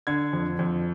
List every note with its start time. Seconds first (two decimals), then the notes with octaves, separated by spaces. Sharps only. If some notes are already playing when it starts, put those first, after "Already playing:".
0.07 D3 G#6
0.33 F2
0.59 F2